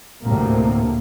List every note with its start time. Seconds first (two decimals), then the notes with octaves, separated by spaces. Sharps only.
0.24 D2 A2 C3 A#3